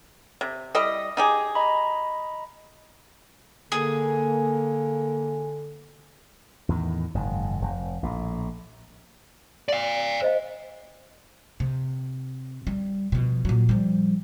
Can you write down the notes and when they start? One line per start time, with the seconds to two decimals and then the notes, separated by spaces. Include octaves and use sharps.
0.41 C3
0.75 G3 E4 D#5 D#6
1.17 D#4 G4 G#4
1.55 D#5 A#5 B5
3.72 D3 A#3 G#4
6.69 E2 A2 D#3
7.15 F#1 G#2 D#3
7.62 F1
8.03 A#1 A2
9.69 D5 F5
10.22 C5 D#5 F5
11.60 C3
12.67 G3
13.12 B2 F3
13.45 A#2 F#3
13.69 F3 G3